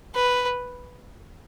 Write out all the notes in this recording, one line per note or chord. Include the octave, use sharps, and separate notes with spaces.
B4